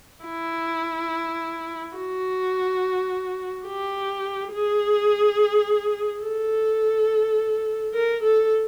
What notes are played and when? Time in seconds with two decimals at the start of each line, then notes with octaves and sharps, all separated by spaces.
0.24 E4
1.96 F#4
3.67 G4
4.52 G#4
6.23 A4
7.94 A#4
8.23 A4